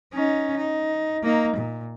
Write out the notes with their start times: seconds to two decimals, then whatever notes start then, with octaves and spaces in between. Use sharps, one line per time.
0.13 C#4 D#4
0.56 D#4
1.23 A#3 D#4
1.56 A#2